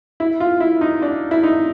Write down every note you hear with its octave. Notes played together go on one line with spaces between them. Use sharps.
E4
F4
E4
D#4
D4
E4
D#4